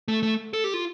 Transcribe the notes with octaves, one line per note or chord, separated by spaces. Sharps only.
A3
A3
A4
G4
F4